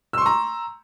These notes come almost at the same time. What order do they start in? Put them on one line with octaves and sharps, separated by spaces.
E6 C6 C#6 A#5